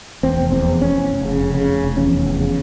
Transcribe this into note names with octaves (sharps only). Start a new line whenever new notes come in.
E2 C4
F1
E2 C4
F1
F1 C#4
F1
F1
C#3
F1
C#3
F1
F1
E2 C#4
F1
E2
C#3